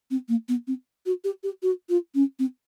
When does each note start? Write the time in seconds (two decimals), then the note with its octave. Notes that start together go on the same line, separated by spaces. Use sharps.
0.11 C4
0.28 A#3
0.48 B3
0.67 C4
1.06 F#4
1.24 G4
1.43 G4
1.62 F#4
1.89 F4
2.14 C#4
2.39 C4